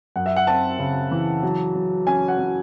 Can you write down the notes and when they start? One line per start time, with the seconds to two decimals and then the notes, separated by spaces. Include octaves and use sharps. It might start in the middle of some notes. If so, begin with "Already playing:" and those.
0.16 F#2 F#5
0.26 E5
0.36 F#5
0.47 C4 A5
0.79 C#3
1.11 E3
1.43 F#3
1.75 F#3
2.07 C#4 G#5
2.28 F#5
2.38 C#4